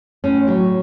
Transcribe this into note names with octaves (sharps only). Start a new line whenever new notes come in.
A2 C#4
F#3